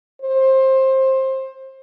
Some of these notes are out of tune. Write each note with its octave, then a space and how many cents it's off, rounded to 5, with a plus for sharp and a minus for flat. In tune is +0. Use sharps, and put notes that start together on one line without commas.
C5 +20